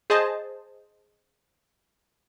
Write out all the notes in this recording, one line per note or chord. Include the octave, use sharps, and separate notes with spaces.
G#4 C5 D#5 A5